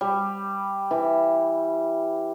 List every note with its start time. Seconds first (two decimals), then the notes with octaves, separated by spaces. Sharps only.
0.01 G3
0.91 E3